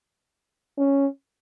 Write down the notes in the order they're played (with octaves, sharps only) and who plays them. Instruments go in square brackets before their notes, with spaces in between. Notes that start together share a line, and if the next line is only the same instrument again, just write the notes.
[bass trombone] C#4